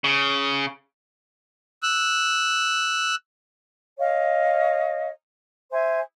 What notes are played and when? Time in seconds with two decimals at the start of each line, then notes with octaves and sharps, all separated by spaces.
0.04 C#3
1.83 E6 F#6
3.98 C#5 D#5 F5
5.71 C5 E5 G#5